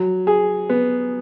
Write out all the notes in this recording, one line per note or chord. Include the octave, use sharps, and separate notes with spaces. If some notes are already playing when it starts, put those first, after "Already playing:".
Already playing: F#3
G#4
B3